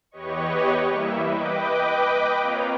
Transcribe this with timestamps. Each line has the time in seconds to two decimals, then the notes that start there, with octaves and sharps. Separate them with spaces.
0.11 E2 G4 B4 C#5 D#5 C#6
0.86 E3 G3 A#3 E4 E5
1.23 B4 D#5 G5 D6
2.39 A#3 C4 F4 C#5 F5 A#5